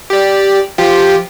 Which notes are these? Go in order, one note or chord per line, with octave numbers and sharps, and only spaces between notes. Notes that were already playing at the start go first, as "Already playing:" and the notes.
G4 D5
F3 F4 G4